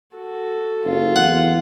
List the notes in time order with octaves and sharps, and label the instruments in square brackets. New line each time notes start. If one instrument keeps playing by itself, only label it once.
[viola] F#4 A4
[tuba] F#1 [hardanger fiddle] F4
[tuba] E2 [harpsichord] F#5